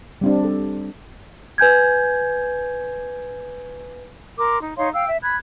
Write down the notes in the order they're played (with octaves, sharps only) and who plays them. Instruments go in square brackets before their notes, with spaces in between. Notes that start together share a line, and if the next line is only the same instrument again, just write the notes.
[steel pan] G3 C4 D4
A4
[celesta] B4 G#5 G6 G#6
[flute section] A#4 C6 D6
D#4
D#4 C#5 F5 C6
F5 G5 E6
E5
B5 F#6 G#6